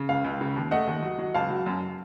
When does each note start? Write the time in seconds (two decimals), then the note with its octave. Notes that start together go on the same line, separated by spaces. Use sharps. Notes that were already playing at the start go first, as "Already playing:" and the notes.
Already playing: C#3
0.09 C#2 F5
0.24 C#2
0.41 C#3
0.56 D#2
0.71 A3 D#5 F#5
0.87 D#2
1.03 F#3
1.19 F#3
1.34 C#2 F5 A5
1.50 F#3
1.66 F#2